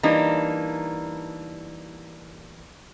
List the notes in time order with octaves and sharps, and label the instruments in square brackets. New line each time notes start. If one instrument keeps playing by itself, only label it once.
[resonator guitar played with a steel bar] E3 G3 A#3 D4 D#4